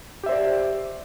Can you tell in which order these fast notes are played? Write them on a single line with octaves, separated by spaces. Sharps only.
G4 E5 C5 D5